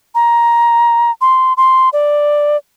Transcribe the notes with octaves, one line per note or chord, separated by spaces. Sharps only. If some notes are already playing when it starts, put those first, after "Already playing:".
A#5
C6
C6
D5